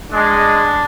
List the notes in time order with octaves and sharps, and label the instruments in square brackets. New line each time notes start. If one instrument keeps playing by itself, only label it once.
[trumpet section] G#3 [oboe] D4